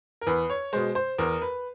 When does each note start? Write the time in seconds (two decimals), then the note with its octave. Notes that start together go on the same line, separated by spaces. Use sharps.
0.21 A#4
0.27 E2 B4
0.50 C#5
0.73 B2 G#3 C5
0.95 C5
1.18 E2 A#4
1.42 B4